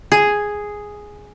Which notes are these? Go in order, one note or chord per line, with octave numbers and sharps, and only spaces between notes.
G#4